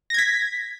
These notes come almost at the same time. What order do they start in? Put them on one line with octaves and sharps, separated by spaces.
A#6 G#6 B6